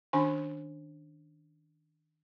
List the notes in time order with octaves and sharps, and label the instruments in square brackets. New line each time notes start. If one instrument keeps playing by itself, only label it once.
[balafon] D#3 C#4 D4 G#5